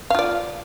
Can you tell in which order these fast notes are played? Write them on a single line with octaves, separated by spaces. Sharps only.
F5 F4 D5